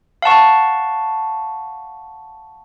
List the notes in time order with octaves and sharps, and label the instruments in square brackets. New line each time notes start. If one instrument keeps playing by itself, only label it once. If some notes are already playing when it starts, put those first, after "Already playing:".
[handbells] F5 F#5 A5 C#6